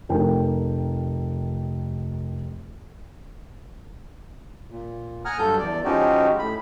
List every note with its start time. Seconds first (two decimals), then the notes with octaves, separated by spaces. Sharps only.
0.09 F1 A#4 G5
4.70 A#2
5.25 F#5 G#5 A#5 D#6 F6
5.38 G2 F#3 A4 G6
5.59 E2 D5
5.85 F3 G#3 C#4 D#4 F#4 G4
6.39 A2 B5